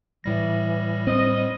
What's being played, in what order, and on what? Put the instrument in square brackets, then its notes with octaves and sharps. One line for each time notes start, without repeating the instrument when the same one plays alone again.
[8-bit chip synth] A2 G3 A#6 [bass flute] E3
[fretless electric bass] C4 [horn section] D#5